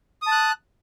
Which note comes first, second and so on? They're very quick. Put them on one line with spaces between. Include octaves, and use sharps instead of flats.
D#6 A5 F#6